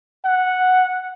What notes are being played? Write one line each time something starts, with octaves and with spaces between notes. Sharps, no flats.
F#5